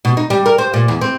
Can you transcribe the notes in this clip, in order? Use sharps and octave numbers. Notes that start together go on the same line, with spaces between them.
B2
D#4
G3
A#4
C5
A#2
E2
C4